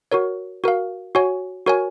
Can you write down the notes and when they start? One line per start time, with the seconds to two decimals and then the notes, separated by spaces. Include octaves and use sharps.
0.12 F#4 A#4 C#5
0.64 F#4 A#4 F5
1.15 F#4 C#5 G#5
1.66 F#4 A#4 C#5 G#5